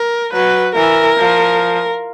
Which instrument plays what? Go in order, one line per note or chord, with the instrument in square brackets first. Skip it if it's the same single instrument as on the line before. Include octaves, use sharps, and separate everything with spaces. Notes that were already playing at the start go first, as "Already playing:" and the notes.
Already playing: [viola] A#4
[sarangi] F#3 [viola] B4
[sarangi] E3 [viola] A#4
[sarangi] F3